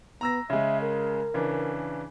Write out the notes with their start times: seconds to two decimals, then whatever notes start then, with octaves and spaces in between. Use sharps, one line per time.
0.21 B3 A#5 E6 A#6
0.50 C#3 G#3 E5
0.81 A#4
1.34 C#3 E3 D4